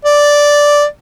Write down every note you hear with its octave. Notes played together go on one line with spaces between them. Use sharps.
D5